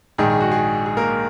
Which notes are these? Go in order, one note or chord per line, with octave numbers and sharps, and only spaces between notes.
A#1 G#2 D#3 G#4
G#4
F#4
G#4
G#4
A#3 A#4